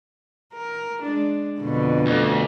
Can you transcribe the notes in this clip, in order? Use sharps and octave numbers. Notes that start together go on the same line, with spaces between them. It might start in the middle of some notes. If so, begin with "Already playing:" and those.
A#4
G#3 D4
F2 B2 D3
D2